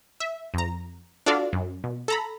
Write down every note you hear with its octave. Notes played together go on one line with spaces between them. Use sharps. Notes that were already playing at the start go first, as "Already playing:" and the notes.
E5
F2 A#5
D4 F4 F#4 A4 D5 F5
F#2
B2
A4 A#5 B5